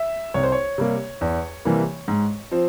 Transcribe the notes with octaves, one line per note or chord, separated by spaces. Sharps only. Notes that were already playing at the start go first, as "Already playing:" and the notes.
Already playing: E5
C2 C#5
C5
C#5
C3 G3 A#3
E2
C3 E3 G3 A#3
G#2
F3 C4